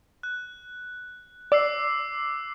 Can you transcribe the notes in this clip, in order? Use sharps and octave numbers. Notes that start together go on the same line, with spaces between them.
F#6
D5 D6 E6 C7